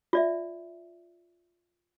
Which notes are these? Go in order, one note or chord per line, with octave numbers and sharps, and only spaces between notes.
F4 D5 E5